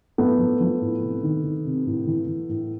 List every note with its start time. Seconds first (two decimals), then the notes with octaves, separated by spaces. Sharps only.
0.18 A2 A3 B3
0.39 F3
0.61 F3
0.81 A2
1.02 C3
1.23 D#3
1.44 D#3
1.65 C3
1.86 A2
2.07 E3
2.27 E3
2.49 A2